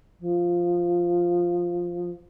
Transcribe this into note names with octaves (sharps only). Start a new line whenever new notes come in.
F3